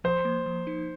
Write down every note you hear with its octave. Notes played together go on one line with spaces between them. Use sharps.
F3 C5
A#3
F3
D#4